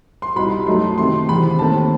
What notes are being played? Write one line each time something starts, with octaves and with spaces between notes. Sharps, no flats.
C6
C2 B2 G3 D#4 B5
F#2 F#3 A3 D#4 C6
C3 D#3 A3 C4 C6
E2 C3 D#3 B5
D#2 D#3 A3 C4 A5